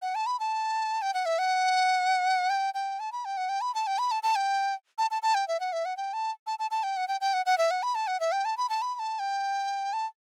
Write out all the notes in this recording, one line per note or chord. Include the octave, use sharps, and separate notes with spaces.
F#5
A5
B5
A5
G5
F#5
E5
F#5
G5
G5
A5
B5
G5
F#5
G5
B5
A5
G5
B5
A5
A5
G5
A5
A5
A5
G5
E5
F#5
E5
F#5
G5
A5
A5
A5
A5
G5
F#5
G5
G5
F#5
F#5
E5
F#5
B5
A5
F#5
E5
G5
A5
B5
A5
B5
B5
A5
G5
A5